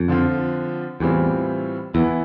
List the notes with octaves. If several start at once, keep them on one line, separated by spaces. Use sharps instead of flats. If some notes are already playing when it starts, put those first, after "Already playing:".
Already playing: F2
D3 F3 C4 F4
E2 A2 E3 G3 C4 F4
E2 E3 B3 E4